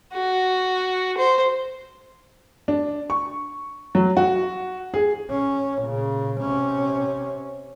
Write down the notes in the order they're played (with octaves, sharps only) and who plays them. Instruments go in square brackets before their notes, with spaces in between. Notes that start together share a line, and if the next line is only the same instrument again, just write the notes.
[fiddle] F#4
C5
[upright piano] D4
C#6
F#3
F#4
G#4
[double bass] C#4
A#2 C#3
C3 C#4